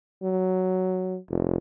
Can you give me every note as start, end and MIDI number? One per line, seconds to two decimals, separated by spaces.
0.23 1.18 54
1.30 1.57 29